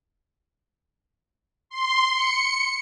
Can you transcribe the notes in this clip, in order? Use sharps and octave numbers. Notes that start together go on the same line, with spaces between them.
C6
C#7